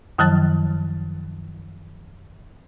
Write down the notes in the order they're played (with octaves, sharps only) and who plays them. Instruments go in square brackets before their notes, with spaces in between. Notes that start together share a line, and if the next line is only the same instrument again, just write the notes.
[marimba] F#2 D#3 F3 F#3 A5 A6